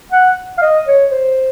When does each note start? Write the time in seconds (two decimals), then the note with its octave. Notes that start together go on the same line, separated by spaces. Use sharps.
0.12 F#5
0.58 F5
0.62 D#5
0.87 C#5
1.12 C5